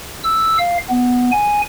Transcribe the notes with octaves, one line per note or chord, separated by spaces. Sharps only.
E6
F5
B3
G#5